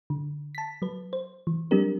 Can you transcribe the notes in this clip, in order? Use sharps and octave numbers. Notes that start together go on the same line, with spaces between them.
D3
A5 B6
F#3 B4
C5
E3
F#3 G3 C4 D4 G4 A#4